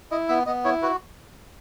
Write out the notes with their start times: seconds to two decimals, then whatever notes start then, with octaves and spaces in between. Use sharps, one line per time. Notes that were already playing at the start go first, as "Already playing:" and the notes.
0.11 E4 D#5
0.29 B3 E5
0.46 B3 D#5
0.65 E4 C#5
0.82 F#4 B4